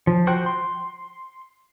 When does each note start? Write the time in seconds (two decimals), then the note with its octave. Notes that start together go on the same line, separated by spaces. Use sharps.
0.07 F3
0.27 F#4 C5 G5 F#6
0.46 C6